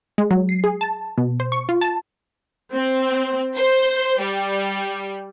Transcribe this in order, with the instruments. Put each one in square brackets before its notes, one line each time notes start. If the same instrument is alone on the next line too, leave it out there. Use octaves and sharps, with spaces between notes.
[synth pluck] G#3
F#3
C7
G#4
A5
B2
C5
C#6
F4
A5
[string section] C4
C5
G3